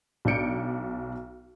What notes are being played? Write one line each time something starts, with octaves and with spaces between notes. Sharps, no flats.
B1 D4 G6 C#7 D7